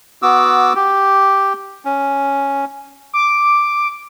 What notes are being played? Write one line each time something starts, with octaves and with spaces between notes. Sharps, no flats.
B3 F#4 D6 E6
G4
C#4
D6